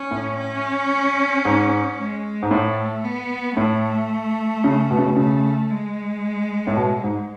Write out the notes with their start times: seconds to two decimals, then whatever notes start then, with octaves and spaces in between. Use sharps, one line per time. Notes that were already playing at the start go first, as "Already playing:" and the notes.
Already playing: C#4
0.11 A2
0.38 C#4
1.45 G#2
1.97 G#3
2.42 G#2
2.51 A2 A3
3.04 B3
3.57 A2 A3
4.64 C#3
4.91 B2
4.98 C#3
5.08 B2
5.16 C#3 A3
5.70 G#3
6.67 A2
6.77 B2
7.04 G#2